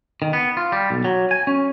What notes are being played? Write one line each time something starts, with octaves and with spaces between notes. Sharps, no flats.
D#3
B3
F4
G3
B1
F#3
G#5
C#4